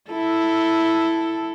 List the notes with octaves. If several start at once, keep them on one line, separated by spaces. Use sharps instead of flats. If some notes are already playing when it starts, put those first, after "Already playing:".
E4 A4